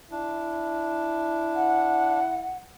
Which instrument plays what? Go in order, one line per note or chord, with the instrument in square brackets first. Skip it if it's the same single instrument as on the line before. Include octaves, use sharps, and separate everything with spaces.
[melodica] D4 [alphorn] E4
[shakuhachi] F#5